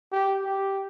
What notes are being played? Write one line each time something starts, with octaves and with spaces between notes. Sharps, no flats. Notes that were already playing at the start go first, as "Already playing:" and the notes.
G4
G4